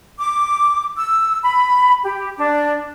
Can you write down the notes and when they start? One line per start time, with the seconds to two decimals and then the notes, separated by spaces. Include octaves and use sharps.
0.18 D6
0.96 E6
1.43 B5
2.03 G4
2.38 D4